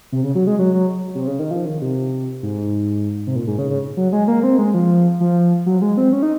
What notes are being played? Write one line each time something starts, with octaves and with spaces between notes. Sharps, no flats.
C3
C#3
F#3
G#3
F#3
F#3
C3
C#3
D#3
F3
D#3
C3
G#2
C3
A#2
G#2
C#3
C#3
F#3
G#3
A#3
C4
G#3
F3
F3
F#3
G#3
C4
C#4
D#4